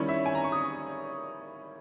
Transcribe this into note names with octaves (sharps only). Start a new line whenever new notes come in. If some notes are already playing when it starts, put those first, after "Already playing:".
Already playing: D#3 G3 C#4 E4 C#5
E5
G#5
A#5
C#6
D#6